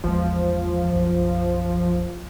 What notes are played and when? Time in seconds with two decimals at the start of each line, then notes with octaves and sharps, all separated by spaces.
0.04 G#1 E2 F3 G#3
0.93 B1 F#2